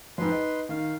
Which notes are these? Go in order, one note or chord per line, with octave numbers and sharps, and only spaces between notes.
F2 G#2 B4 C6
D#4
D#3 F5